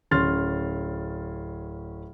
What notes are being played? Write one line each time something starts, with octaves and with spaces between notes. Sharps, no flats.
D1 C#4 C6 F6 A6